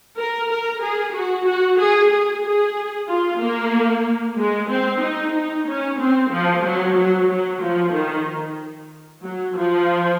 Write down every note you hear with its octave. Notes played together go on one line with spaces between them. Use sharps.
A#4
A#4
G#4
F#4
F#4
G#4
G#4
G#4
F4
A#3
G#3
C4
D#4
D#4
C#4
C4
F3
F#3
F#3
F#3
F3
D#3
F#3
F3